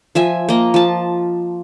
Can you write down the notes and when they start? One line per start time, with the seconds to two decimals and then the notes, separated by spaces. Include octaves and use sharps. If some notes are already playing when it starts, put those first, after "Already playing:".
0.15 F3 E5 G#5
0.49 A#3 D#5
0.74 F3 A5